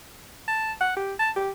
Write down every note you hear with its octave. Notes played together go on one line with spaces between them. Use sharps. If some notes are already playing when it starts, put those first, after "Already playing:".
A5
F#5
G4
A5
G4